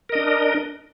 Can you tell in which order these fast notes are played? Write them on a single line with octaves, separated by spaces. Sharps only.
A#4 D#5 D4